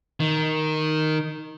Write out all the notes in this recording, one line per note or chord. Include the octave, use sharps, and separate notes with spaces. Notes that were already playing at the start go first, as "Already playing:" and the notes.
D#3